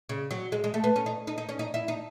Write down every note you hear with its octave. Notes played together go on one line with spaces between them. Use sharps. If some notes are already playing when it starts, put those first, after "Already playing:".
C#3
F#3
G#3
G#3
A3
B3
C#4
D#4
D#4
D#4
C#4
D#4
E4
D#4